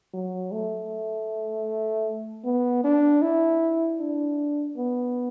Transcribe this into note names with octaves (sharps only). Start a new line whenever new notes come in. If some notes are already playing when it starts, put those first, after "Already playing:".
F#3
A3
B3
D4
E4
D4
B3